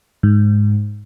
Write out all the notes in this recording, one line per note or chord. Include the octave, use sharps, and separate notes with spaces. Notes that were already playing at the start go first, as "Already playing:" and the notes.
G#2